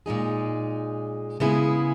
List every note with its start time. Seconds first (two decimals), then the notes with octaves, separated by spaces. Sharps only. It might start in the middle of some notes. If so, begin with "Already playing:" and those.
0.06 A#2 G#3 D#4 G#4
1.40 C#3 G#3 B3 E4 G#4